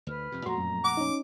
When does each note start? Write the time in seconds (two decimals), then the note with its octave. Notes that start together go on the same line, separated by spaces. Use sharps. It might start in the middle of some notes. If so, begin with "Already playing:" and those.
0.07 D2 B4 F6
0.32 F2 C3
0.46 F2 A#2 A3 F#4 A#5 C6
0.58 F#2
0.84 F#5 D6
0.97 C#4 D#4